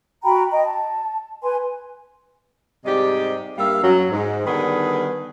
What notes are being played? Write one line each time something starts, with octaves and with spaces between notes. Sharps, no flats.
F#4 G5 A#5 B5
D#5 G5
A5
B4 G#5 C6
G#2 C3 G3 G4 D5 D#5
G2 G3 A#3 E5 F5
F#2 F#3
G#2
D3 D#3 G3 B3 G#4 B4